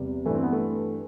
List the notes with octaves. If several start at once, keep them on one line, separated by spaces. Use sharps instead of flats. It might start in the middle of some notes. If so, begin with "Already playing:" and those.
Already playing: E2 C3 G3
G2 E3 A3
C4
B3
A3